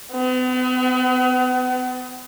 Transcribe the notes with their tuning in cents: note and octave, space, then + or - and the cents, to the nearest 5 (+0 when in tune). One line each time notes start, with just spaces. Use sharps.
B3 +40